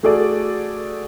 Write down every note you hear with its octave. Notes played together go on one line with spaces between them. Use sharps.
A3 F#4 G#4 A4 D5